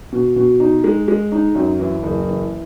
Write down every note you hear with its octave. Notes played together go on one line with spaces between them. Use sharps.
B2
B2
D#4
G#3
G#3
D#4
F#2
E3
F#1
E3